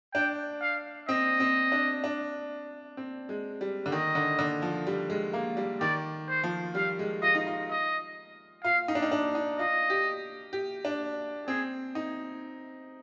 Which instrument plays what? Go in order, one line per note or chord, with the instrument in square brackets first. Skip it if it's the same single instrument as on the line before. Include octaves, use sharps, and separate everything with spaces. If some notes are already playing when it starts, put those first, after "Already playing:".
[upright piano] D4 [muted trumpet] G5
[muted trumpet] F5
[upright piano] C4 [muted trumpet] D#5
[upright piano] C4
D4
D4
C4
G#3
G3
D3
[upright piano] D#3 [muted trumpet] D#5
[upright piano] D3
D3
F3
G3
G#3
A#3
G3
[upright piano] D#3 [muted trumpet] D5
[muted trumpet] C5
[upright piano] F3
[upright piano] G3 [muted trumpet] F5
[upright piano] G#3
[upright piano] F4 [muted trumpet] D#5
[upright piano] D#4
F4
[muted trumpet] D#5
[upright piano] F4 [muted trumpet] F5
[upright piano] D#4
D4
D#4
D4
D#4
[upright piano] F4 [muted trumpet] D#5
[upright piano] G4
G4
D4
[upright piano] C4 [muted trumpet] G#4
[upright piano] D#4